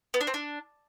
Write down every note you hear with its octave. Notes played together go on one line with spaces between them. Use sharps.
B3
D4
C4
D4